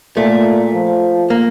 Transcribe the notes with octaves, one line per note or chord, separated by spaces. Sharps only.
A#2 A3
F3
A#3